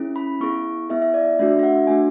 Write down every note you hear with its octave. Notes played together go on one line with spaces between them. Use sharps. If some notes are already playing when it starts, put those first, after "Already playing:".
Already playing: C#4 E4 G#4
B5
B3 E4 G#4 C#6
B3 E4 G#4 E5
E5
D5
A3 D4 F#4 E5
E5
F#5
A3 D4 F#4 G#5